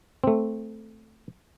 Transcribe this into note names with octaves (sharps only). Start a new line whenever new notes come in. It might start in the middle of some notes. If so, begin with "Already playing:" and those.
A3 C4